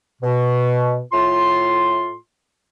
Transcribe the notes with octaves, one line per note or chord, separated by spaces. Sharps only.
B2
A2 F4 C6